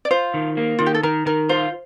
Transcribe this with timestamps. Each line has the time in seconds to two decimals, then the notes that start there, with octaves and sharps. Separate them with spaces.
0.05 D5
0.11 F4 C5
0.34 D#3
0.57 A#3
0.79 D#3 F4
0.86 G4
0.94 A4
1.03 D#3 A#4
1.26 D#3 A#4
1.49 F4 C5